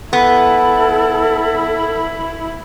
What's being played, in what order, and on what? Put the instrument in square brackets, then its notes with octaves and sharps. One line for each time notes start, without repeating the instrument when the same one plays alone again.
[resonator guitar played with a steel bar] B3 [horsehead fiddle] E4 [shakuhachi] A4